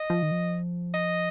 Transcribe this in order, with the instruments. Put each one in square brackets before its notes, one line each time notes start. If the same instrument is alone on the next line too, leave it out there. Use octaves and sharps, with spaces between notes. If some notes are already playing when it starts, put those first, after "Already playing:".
Already playing: [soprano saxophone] D#5
[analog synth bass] F3
D#3
F3
[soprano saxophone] D#5